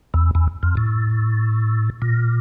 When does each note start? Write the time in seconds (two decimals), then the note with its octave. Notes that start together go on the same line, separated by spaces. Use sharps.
0.14 E2
0.35 E2
0.63 F2
0.77 A2
2.02 A#2